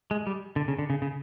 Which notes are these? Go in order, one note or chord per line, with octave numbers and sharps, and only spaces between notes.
G#3
G3
D3
C#3
D3
C#3
C#3